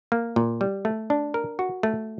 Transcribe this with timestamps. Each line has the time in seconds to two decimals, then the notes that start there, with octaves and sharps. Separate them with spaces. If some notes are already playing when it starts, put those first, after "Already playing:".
0.12 A#3
0.36 A#2
0.61 G3
0.85 A3
1.10 D4
1.34 A#4
1.59 F#4
1.83 A3